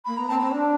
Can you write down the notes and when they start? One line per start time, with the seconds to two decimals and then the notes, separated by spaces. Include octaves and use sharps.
0.05 A#3 B5
0.17 B3 A#5
0.28 C4 A5
0.40 C4
0.51 D4